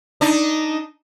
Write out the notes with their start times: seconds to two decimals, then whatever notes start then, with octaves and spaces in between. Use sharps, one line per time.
0.21 D4 D#4